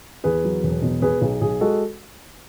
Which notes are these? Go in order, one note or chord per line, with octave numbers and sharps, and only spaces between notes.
E2 G#4 B4
F#3
E1
B2
B2 G#4 B4
B1 G#4
B1 G#4
G#3 F#4 A4